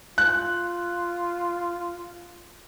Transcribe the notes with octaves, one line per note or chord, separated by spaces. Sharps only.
F4 F#6